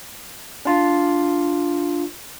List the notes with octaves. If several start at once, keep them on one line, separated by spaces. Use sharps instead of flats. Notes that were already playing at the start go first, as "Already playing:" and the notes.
D4 F4